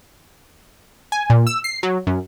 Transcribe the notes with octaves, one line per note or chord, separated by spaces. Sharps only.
G#5
A#2
E6
C7
F#3
F#2